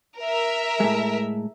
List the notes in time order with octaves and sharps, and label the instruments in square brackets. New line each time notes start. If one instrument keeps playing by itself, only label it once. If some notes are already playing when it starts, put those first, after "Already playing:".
[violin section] A#4 E5
[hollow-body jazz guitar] A2 G#3